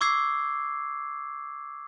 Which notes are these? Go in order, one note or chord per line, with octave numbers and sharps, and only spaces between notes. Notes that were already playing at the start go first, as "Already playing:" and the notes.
C#6 D6 E6 G#6 C7